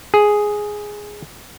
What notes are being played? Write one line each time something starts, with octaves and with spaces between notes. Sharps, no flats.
G#4